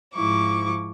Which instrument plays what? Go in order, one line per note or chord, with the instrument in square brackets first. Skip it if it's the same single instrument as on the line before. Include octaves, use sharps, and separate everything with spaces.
[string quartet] G#2 F3 E4 C#6 D6